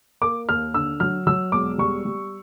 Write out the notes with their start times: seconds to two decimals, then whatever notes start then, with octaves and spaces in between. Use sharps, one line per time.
0.21 A#3 D6
0.49 D#2 F6
0.74 D3 E6
1.00 F#3 F6
1.27 F#3 E6
1.52 E1 D6
1.78 G3 C#6
2.05 G3